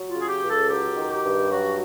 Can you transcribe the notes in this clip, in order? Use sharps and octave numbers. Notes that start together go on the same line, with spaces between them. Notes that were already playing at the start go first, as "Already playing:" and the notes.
Already playing: F#3
F4
C#3
G#4
G4
C#2
A4
F#3 G4
D#3
G4
G2
F#3 F#4